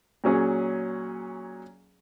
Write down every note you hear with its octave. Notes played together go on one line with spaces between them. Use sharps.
A#2 F#3 C#4 G#4